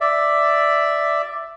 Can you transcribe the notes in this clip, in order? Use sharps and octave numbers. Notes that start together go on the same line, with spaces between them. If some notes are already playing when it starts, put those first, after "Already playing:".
D5 E5